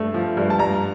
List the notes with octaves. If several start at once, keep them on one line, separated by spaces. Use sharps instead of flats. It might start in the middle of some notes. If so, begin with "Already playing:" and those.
Already playing: G2 A3
F3
G2
A5
G2 A#5